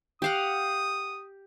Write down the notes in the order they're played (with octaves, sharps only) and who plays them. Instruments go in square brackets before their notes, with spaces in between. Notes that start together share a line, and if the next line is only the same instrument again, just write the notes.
[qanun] G4 F5 F#5 [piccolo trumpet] D#6